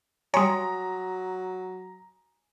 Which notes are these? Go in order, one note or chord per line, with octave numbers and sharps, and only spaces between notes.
F#3 G3 C#5 G#5 A#5 C6 D#6